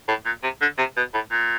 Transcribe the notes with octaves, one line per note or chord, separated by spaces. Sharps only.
A2
A#2
C3
D3
C3
B2
A2
A#2